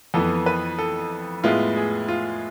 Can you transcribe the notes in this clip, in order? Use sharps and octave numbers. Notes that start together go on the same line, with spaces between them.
F2 E3 B3 A4
B4
A4
A2 G#3 B3 E4 F4
G#4
F4